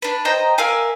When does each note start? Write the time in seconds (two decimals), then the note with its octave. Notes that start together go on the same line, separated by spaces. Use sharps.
0.02 D4 B4
0.25 C5 D#5 G5 A#5
0.58 A#4 E5 F5 G#5